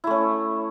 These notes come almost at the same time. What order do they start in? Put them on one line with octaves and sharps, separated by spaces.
E4 A3 C#4